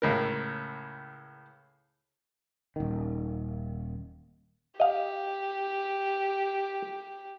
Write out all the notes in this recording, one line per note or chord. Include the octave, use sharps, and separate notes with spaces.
C#2 A2 A#4
D#1 D#3
G4 D#5 F5